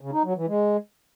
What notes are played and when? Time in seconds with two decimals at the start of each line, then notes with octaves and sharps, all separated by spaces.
0.01 C#3
0.13 D#4
0.25 F#3
0.36 E3
0.48 G#3